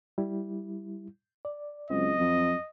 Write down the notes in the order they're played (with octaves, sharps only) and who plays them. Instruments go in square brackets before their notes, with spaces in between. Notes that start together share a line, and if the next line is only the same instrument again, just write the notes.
[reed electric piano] G3 E4
D5
[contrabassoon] C#2 [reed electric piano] F#3 C4 [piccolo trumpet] D#5
[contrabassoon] F2